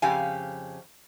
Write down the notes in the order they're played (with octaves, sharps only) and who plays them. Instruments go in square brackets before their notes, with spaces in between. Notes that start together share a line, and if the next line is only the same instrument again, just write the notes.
[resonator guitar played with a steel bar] F2 C#3 G4 F5 G#5